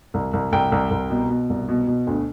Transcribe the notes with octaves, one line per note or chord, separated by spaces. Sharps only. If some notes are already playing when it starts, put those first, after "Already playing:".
C2
C2
C2 G5
C2
C2
B2
B2
C2
B2
B2
D2